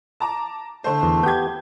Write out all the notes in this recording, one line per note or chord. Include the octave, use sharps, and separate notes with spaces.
A5 A#5 D6
D3 A3 C5
E2
B3 G4 G6 G#6